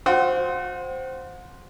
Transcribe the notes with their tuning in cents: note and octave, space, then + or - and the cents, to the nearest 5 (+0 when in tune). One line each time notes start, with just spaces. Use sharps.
F#4 -40 C5 +0 F#5 +45